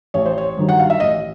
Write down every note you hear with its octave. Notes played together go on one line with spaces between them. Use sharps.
A1 C#5
C5
C#5
G2 D#3 F#3
F#5
F5
E5
A1 D#5